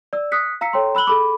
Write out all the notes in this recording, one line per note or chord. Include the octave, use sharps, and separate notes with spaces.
D5 E6
D#6 F#6 B6 C#7
F5 A#5 E6 B6 C#7
A4 C#5 G5 A#5 C6
B5 E6 F#6 F#7 G7
G#4 A4 B5 D6